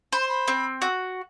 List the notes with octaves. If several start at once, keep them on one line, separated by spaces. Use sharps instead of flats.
C5 B5
C6
B5
C4
F#4